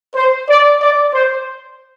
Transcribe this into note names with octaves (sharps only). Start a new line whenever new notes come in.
C5
D5
D5
C5